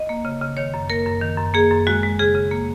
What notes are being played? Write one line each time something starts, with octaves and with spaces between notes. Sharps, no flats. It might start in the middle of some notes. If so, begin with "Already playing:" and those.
Already playing: D#5
A#3
C#3
C#3
D#3 C#5
F#2
A#3 A#4
F#2
D#3
F#2
A#3 G#4
F#2
G#3 F#4
G#3
C#3 G#4
C#3
A#3